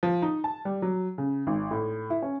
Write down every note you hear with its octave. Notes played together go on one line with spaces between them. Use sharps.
F3
D#4
A5
G3
F#3
C#3
G#1
A2
E4
C#4